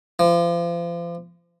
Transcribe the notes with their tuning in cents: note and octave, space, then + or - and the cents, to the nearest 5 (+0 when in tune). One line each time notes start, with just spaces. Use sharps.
F3 -35